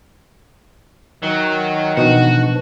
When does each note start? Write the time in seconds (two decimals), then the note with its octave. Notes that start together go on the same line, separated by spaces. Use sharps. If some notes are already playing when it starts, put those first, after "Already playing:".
1.23 D#3 F#3
1.97 B2 E3 F3 D4 D#4 F#4